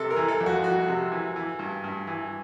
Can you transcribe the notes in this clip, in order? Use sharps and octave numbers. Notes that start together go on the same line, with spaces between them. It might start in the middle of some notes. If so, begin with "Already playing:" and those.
Already playing: C3 A4
A#4
E3
A4
F2
F#4
F2 F#4
C3
E3
E3
G2
G2
E3